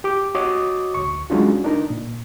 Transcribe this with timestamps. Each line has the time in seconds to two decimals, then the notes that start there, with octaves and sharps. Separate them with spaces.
0.04 G4 D6
0.35 F#4 C#5 D#5 D6 D#6
0.94 D2 C#6
1.30 F#3 G#3 C#4 D4 F4 F#4
1.64 D4 D#4 A#4
1.90 A#2